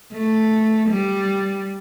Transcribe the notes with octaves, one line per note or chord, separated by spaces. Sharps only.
A3
G3